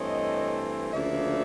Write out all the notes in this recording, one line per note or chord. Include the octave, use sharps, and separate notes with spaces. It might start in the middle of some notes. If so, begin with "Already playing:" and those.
Already playing: G2 E3 A3 C4 C#5 D#5
D2 C#3 F3 A#3 D4 D5 E5